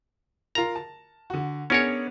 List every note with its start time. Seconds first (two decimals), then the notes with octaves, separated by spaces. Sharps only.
0.55 F4 A#4 A#5
0.76 A5
1.30 D3 F#4
1.70 B3 C#4 D4 G#4 A#4 C#5